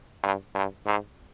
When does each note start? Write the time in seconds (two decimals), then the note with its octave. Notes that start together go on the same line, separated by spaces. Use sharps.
0.23 G2
0.55 G2
0.86 G#2